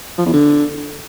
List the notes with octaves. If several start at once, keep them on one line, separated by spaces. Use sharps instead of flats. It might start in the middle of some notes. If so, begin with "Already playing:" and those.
F3
E2
D3